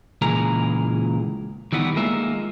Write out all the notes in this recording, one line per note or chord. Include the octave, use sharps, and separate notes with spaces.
C#2 A#2 E3 G#4 A#4 A#5
D#3 E3 G3 B3
G#3 A#3 D#4 F4 E5